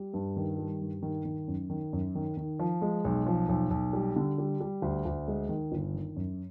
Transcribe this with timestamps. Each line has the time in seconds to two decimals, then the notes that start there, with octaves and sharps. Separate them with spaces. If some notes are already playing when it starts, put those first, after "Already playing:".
Already playing: G3
0.14 G2
0.37 D#3
0.58 G3
0.81 G2
1.02 D#3
1.25 D#3
1.48 F#2
1.70 D#3
1.93 F#2
2.15 D#3
2.37 D#3
2.59 F3
2.82 G#3
3.05 B1
3.26 F3
3.49 B1
3.71 B1
3.93 G3
4.16 D3
4.38 G3
4.61 G3
4.82 D2
5.05 D2
5.28 G#3
5.49 D#3
5.72 G1
5.94 D#3
6.16 F#2